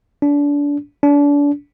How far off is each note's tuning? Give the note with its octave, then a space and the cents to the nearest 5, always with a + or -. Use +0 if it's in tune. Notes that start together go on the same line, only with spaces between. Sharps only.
D4 -30
D4 -35